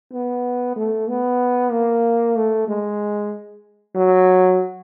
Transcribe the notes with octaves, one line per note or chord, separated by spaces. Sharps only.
B3
A3
B3
A#3
A3
G#3
F#3